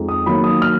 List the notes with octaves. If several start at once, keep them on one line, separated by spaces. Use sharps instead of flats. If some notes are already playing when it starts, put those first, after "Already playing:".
Already playing: F2 F3 G#3 D#4
D#6
D#3 F#3 A#3 B5
D#6
F6